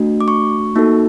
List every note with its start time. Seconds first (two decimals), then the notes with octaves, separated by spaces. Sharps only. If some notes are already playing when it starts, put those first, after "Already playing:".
Already playing: A3 D4 F#4
0.21 D6
0.28 C#6
0.76 A#3 D#4 F#4 A4